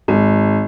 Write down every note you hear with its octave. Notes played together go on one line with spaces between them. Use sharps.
G#1